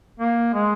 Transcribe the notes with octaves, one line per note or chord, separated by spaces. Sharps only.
A#3
G#3